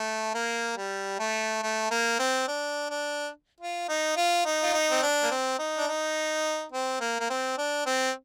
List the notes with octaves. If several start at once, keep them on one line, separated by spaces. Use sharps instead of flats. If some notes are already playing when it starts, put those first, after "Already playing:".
Already playing: A3
A#3
G3
A3
A3
A#3
C4
D4
D4
F4
D#4
F4
D#4
F4
D#4
C4
D4
A#3
C4
D#4
D4
D#4
C4
A#3
A#3
C4
D4
C4